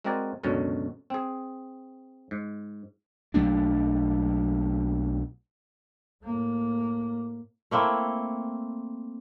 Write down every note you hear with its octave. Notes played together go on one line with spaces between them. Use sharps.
G#3 C4 F#4 A#4 D5 G#5
C#2 F#2 B2 D3 C#4
C4 G#4
G#2
B1 F#3 A3 D4
A2 A#3
A3 A#3 C4 E4